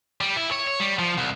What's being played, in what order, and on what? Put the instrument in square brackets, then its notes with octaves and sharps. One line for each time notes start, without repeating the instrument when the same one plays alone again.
[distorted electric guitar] G3
E4
C#5
C#5
G3
F3
C2